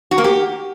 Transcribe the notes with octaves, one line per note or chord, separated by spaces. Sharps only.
F#4
A#3
G4